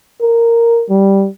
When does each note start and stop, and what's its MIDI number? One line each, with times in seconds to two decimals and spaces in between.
0.21 0.85 70
0.90 1.28 55